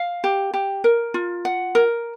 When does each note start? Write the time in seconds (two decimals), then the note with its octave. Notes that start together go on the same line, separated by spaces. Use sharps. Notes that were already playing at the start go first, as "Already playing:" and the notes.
Already playing: F5
0.24 G4
0.54 G4
0.84 A#4
1.14 F4
1.45 F#5
1.75 A#4